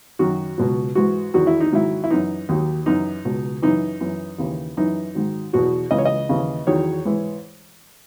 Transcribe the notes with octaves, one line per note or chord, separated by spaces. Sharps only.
F#2 D#3 F#3 F#4
C#2 B2 F#3
G#2 E3 F#4
E2 D#3 F#3 F#4
E4
D#4
G#2 D#3 F#3 E4
E4
F#2 E3 D#4
D#2 D#3 F#3
F#2 E3 D#4
C#2 B2 F#3
F#2 E3 D#4
F#2 E3
D#2 C#3 E3
F#2 E3 D#4
G#2 D#3 F#3
E2 B2 F#3 F#4
C#2 C#3 E3 D#5
C#5
D#5
D#2 C#3 E3
E2 D#3 F#3 C#5
G#2 E3